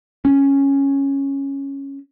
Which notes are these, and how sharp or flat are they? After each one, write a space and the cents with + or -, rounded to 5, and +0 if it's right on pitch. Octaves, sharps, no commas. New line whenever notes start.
C#4 -5